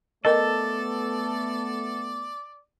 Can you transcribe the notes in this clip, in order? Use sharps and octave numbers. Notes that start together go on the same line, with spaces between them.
A3 B3 A4 A#4 D5 D#5